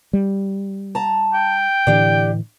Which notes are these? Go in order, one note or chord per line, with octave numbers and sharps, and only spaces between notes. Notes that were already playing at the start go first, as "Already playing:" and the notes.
G3
A5 A#5
G5
A2 D3 E3 D4 G4